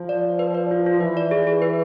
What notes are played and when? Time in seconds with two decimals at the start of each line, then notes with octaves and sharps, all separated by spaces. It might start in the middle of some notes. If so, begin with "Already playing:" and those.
Already playing: F3 F4
0.09 D5
0.25 D5
0.39 B4
0.55 D5
0.71 F4
0.86 F4
1.01 E3 B4
1.17 D5
1.31 G#4
1.47 G#4
1.62 B4